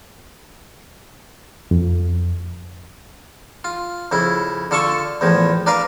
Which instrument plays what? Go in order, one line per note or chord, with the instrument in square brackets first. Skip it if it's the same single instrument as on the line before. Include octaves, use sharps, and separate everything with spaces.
[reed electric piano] F2
[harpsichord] F4
F2 C#3 E4
D3 F4 A4 A5 C#6
E2 A2 F3
D4 A#4 B4 F5